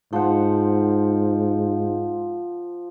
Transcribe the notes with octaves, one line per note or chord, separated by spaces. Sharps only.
G#2 F3 C5 F#5